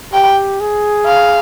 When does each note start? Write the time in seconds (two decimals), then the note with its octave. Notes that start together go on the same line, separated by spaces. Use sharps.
0.13 G4 G5
0.60 G#4
1.06 F5